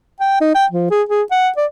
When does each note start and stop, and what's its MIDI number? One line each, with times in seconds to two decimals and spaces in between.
0.20 0.36 79
0.41 0.54 63
0.55 0.66 79
0.72 0.90 53
0.91 1.02 68
1.09 1.23 68
1.31 1.49 78
1.57 1.66 74